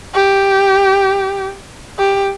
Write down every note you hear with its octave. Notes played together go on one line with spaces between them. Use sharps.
G4
G4